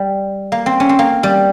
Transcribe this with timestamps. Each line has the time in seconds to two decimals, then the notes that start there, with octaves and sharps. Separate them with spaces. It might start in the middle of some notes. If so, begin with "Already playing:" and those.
Already playing: G3
0.52 A#3
0.66 C4
0.80 C#4
0.89 C4
0.99 A#3
1.23 G3